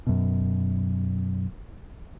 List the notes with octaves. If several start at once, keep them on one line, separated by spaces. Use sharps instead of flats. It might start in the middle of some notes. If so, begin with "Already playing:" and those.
F#2 B2